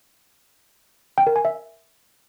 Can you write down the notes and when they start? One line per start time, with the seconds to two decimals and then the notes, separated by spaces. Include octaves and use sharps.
1.18 G5
1.27 A#4
1.36 G#5
1.45 E5